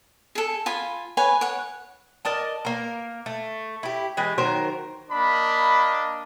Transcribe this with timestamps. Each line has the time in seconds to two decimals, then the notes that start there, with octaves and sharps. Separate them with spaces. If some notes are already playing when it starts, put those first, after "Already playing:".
0.35 G#4 A4
0.66 F4 G#5 B5
1.17 B4 C#5 G#5
1.41 C#5 F#5
2.25 A#4 D5 D#5 A5
2.65 A#3 A#4
3.26 A3
3.83 E4 G4
4.17 E3 G#3 G4
4.38 D#3 F#3 A#4 C5
5.11 A#3 D4 D#5 B5